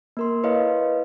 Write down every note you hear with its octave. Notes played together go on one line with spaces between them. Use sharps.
A#3 A#4 C6
E4 B4 C#5 D#5 F5